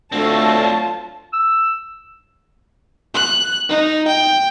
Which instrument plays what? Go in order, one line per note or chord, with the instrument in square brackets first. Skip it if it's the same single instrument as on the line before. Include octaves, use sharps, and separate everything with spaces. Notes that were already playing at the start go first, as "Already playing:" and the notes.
[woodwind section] D2 D3 [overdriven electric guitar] F#3 C4 [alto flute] A3 [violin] F4 A5
[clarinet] E6
[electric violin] F#6
D#4
G5